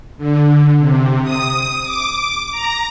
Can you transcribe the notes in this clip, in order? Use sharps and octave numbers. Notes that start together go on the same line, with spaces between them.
D3
C3
D#6
D6
A#5